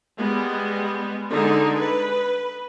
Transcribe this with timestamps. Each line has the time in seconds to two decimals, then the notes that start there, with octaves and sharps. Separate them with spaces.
0.18 G3 G#3 B3
1.32 D3 G#3 D#4 G#4
1.76 B4